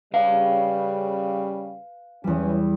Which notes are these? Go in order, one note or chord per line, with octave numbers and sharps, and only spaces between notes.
C#3 G3 B4 F5
E2 E3 G3 C#4